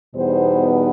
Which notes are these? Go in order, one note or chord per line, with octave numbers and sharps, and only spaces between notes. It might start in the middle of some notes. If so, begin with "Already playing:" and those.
E2 B2 G3 B3 D#4 C5